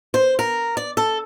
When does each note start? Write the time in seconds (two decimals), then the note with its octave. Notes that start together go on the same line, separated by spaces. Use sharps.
0.14 C5
0.39 A#4
0.77 D5
0.97 A4